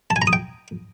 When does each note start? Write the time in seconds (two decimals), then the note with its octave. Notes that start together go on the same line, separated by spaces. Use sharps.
0.10 A5
0.16 G#5
0.22 A#5
0.27 D#6
0.33 G5